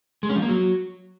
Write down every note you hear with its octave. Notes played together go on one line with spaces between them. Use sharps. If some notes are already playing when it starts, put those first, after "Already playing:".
G#3
C#4
F3
A#3
F#3